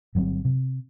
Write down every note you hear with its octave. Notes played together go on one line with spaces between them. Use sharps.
G1 F#3 G3 C4
C3